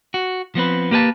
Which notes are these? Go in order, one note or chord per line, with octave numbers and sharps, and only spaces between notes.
F#4
F3 B3 C4 B4
A#3 G4 B4 F5 A5